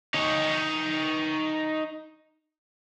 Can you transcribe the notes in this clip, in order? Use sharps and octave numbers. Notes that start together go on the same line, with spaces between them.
D#4 C#5